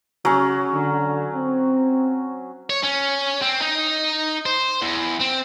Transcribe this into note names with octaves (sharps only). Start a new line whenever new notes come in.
C#3 F#3 C#4
D3
C4
C#5
C#4
C4
D#4
C5
E2
C4